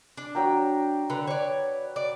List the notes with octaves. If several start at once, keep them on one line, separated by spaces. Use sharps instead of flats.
D4
F#3 G5 A#5
D3 B4
C#5 D5
D5